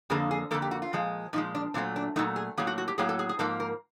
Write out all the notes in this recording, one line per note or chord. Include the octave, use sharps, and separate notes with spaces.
F2 D3 F3 A#3 G#4
G#4
F2 D3 F3 A#3 A4
G4
F#4
F4
A#2 F3 G#3
A#2 F3 G#3 D#4
D4
A#2 F#3 A3 C4
D4
A#2 F#3 A3 D#4
G#4
A2 F#3 A#3 G#4
F#4
F#4
G4
A2 F#3 A#3 G#4
A4
G#4
G#4
G#2 F3 A#3 A4
A#4